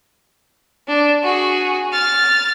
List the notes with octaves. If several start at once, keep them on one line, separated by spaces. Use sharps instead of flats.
D4
F#4 G#4
F6 A6